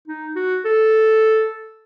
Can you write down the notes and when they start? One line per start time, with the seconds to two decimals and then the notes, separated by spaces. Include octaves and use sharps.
0.08 D#4
0.36 F#4
0.65 A4